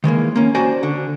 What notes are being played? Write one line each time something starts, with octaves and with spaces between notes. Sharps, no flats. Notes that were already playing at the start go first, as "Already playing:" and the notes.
D#3 E3 G#3 A#3
A#3 C#4
F#4 C5 D5 G5 G#5 A#5
D3